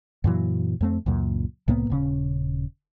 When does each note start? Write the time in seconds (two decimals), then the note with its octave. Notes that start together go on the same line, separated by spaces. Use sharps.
0.24 F#2 A#2 E3 F#3
0.81 F2 A3 C4
1.06 C#2 F#2 A#2
1.68 C2 A2 A#3 B3
1.90 D#1 C#3 C#4